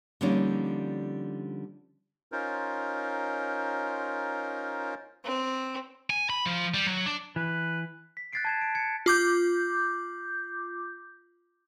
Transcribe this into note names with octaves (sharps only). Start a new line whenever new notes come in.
D3 F3 G3 A#3 C#4 D#4
C#4 D#4 F4 A#4 C5
C4
G#5
B5
F3
G3
F#3
D4
E3 B4
B6
F#6 G#6 A6 B6 C7 D7
A5 G#6 E7
D7
G#6 C#7
F4 D6 G6